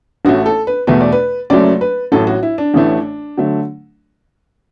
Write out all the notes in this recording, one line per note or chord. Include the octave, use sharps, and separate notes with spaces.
A1 A2 A3 F#4
A4
B4
E2 B2 A3 B4
D5
B4
F#1 F#2 F#3 A3 D5
B4
A1 A2 F#3 A4
F#4
E4
D4
A1 A2 E3 A3
D3 F#3 A3